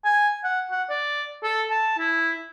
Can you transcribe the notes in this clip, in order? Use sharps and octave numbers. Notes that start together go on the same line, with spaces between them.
G#5
F#5
F#5
D5
A4
A5
E4